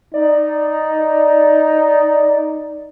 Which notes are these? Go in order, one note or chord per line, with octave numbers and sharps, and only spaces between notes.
D#4 D5